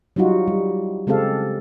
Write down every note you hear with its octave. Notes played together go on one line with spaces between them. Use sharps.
F#3 G3 D#4 F4 F#4
G3
C#3 G#3 C4 G4 A4 F5